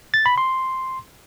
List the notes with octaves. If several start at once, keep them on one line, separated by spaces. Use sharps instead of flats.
A6
B5
C6